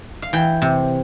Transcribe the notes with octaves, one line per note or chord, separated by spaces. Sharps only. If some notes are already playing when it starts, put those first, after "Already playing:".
F5
E3 G5
C3